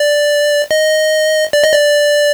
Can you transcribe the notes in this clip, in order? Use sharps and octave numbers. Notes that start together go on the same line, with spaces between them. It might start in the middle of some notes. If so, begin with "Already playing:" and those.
Already playing: D5
D#5
D5
D#5
D5